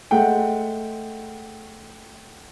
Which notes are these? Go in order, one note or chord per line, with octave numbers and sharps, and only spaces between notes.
G#3 A3 F#5 G5